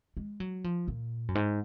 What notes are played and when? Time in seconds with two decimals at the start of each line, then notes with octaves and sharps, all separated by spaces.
0.17 G#3
0.40 F#3
0.64 F3
0.88 A#2
1.28 F#2
1.35 G#2